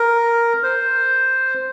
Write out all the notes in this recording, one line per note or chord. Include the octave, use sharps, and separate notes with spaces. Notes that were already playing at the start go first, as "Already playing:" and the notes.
Already playing: A#4
C5